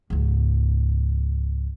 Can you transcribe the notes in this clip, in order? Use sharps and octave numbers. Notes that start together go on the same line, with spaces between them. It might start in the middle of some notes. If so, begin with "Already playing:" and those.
C#2 G#2